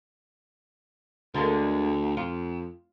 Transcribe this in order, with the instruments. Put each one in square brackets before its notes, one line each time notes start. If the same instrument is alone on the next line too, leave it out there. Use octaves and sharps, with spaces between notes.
[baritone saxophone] D2 [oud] D3 G#3 A#3
[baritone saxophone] F2 [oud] F4